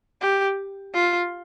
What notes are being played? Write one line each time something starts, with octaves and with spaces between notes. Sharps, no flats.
G4
F4